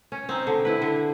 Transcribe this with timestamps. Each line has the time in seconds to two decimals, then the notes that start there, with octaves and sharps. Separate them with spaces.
0.12 C#4
0.29 C4 D#4
0.47 D3
0.65 E4 B4
0.82 D3